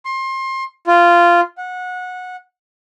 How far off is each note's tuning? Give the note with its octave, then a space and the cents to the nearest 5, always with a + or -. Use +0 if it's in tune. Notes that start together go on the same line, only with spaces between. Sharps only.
C6 +30
F4 -10
F#5 -20